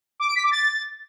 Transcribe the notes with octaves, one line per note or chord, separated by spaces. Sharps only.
D6
D7
B6
D6
A6